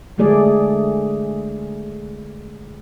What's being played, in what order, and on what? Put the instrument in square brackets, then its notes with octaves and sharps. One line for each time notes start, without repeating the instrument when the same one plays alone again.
[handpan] D3 G#3 A3 G#4 D5